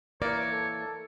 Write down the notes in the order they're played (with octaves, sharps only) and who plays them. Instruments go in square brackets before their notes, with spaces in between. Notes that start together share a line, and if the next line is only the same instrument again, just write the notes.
[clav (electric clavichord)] E3 A#3 [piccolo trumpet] A#4 [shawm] C#5 [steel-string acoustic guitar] D5
[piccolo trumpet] A4